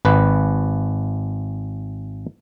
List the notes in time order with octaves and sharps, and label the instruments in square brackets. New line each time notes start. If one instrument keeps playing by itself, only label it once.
[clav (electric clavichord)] G#1 B4